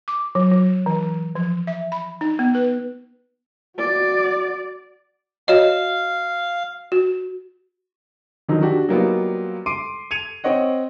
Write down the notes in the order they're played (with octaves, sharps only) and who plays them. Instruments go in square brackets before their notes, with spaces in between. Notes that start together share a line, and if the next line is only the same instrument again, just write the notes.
[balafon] D6
F#3
F#3
E3
F3
E5
B5
D#4
B3
B4
[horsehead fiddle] F#4 D5
[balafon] F#4 C#5 D#5 [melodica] F5
[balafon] F#4
[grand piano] D3 D#3 F3 F#3 D#4
D4 F#4 G4
F#3 G3 A#3 B3 D#4 F4
C6 D6 C7 D7 D#7
G#6 C#7 D#7 F7
C4 C#5 D#5 F#5